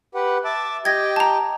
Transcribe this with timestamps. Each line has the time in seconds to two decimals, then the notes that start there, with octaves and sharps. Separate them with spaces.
0.15 G4 B4 F#5
0.44 E5 A5 D6
0.85 G4 D#5 G5 G#6 A#6
1.16 A5 A#5